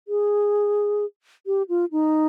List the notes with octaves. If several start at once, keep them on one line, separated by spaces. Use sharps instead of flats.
G#4
G4
F4
D#4